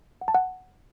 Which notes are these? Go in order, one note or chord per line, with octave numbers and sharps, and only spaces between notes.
F#5
A5
F#5